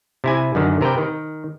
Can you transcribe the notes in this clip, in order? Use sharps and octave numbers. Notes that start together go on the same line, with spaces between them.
C3 E4 G#5
F#2 D3 D#3
C3 A#4 B4 G5
D#3